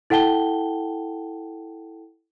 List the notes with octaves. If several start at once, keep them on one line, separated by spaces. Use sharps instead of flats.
E4 A4 F#5 G5 A5 G7